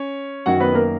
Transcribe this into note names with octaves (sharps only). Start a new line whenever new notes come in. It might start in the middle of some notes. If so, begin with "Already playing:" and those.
Already playing: C#4 C#5
F#2 D#3 F#4 F#5
B3 B4
A#3 A#4